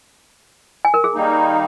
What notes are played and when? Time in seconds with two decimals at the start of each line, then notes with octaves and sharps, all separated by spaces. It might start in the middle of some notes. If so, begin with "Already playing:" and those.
0.85 G#5
0.94 A#4
1.04 G#4
1.15 D#3 G3 A#3 D#4